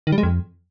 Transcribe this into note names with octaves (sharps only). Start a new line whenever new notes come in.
D#3
G3
G#3
F2